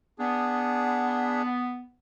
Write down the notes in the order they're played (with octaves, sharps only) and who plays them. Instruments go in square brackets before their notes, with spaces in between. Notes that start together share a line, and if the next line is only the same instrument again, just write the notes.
[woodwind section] B3 [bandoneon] D4 G#4